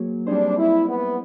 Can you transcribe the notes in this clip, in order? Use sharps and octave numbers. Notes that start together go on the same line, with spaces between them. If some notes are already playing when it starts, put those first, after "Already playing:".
Already playing: F#3 A#3 G#4 C5
G3 C4 D4 D#4 G#4 C5
E4
B3